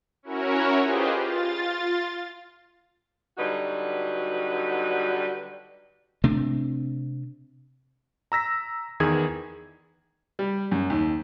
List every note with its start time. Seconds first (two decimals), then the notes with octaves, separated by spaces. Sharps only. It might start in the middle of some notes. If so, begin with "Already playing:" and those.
0.23 C#4 E4 F#4 A#4 C#5
0.82 F4 G4 G#4 B4 C5 D#5
1.23 F4 A6
3.38 D3 F#3 G3 D#4 F#4 B4
6.24 C3 A3 C4 D4
8.32 A#5 E6 A#6 B6
9.00 E2 D#3 E3 G#4 G#6
10.39 G3
10.71 F#2
10.90 D#2